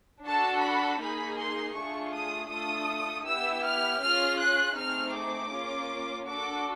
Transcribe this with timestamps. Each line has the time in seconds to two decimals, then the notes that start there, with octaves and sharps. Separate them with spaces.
0.24 D4 F#4 A4 A5
0.62 B5
1.00 A#3 D#4 G#4 B5
1.38 C6
1.75 A3 D4 F4 G#4 C#6
2.13 D#6
2.51 A3 D4 F4 A4 D#6
3.27 B3 E4 G4 E6
3.64 F6
4.02 C#4 F4 G#4 F6
4.39 F#6
4.77 A3 C4 D#4 G#4 F6
5.15 D6
5.53 A#3 C#4 F4
6.28 D4 F#4 A4 D6